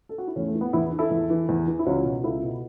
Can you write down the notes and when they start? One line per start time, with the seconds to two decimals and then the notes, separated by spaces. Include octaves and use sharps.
0.09 A4
0.18 F#4
0.27 E4
0.36 E2 A3 C#4
0.48 A3
0.55 E3
0.61 B3
0.73 E2 B3 E4
0.92 E3
0.98 E4 A4
1.11 E2
1.30 E3
1.49 E2
1.67 E3
1.79 E4
1.86 C#2 C#4 F#4
2.05 B2
2.23 C#2 E4 A4
2.43 B2